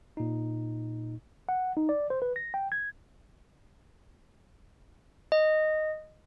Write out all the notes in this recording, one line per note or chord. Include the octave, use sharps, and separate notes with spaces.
A#2 D#4
F#5
D#4
D5
C5
B4
A#6
G5
G#6
D#5